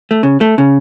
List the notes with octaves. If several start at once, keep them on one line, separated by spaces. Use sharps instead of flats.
A3
C#3
A3
C#3